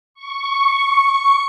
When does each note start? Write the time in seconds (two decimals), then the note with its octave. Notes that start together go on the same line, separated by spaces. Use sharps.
0.14 C#6